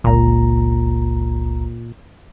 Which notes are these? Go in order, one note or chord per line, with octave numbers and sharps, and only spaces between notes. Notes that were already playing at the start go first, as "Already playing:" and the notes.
G1 C#2 A#2 A#5